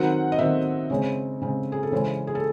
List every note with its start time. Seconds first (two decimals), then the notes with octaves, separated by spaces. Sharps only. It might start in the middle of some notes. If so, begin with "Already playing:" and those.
Already playing: D#3 F#3 C4 F#5
0.32 D#5
0.38 D#3 F#3 C4 E5
0.90 C#3 G#3 C4 C#5
1.42 C#3 G#3 C4
1.72 G#4
1.83 A4
1.92 C#3 E3 G#3 C#4 C5
2.27 G#4
2.35 A4